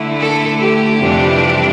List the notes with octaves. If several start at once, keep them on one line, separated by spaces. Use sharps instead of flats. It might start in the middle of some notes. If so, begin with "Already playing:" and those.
Already playing: D3 A3 E4
A4
G4
F2 C3 E3 G3 D4